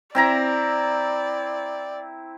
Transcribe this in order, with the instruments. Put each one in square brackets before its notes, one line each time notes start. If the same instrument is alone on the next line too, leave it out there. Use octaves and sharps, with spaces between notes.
[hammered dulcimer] C4 E4 A#5 [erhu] D5